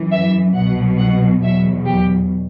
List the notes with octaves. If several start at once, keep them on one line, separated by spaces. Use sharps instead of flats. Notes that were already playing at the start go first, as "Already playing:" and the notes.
Already playing: F#2 E3
E5
C2 B2 F#3 F#5
F#5
E2 B2 F#3 E5
G4